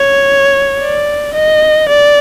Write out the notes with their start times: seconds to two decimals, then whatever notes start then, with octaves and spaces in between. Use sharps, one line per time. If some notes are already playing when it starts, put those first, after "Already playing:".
Already playing: C#5
0.81 D5
1.34 D#5
1.89 D5